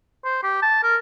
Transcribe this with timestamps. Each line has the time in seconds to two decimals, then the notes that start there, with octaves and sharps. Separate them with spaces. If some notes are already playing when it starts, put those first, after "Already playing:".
0.24 C5
0.43 G4
0.63 A5
0.84 A#4